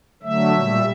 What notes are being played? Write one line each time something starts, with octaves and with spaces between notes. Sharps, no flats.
D3 F#3 A3 E5
A#2 G3